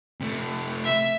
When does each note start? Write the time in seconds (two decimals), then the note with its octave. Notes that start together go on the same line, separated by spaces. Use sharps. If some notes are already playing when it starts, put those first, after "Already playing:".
0.21 C3 A3
0.84 E5